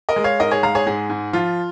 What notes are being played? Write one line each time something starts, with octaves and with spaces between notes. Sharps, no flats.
A#4 D#5
G#3
C#5 F5
G#2 A#4 D#5
G#4 C#5
G#3 F5 A#5
G#4 C#5
G#2 G#4
G#2
F3 F4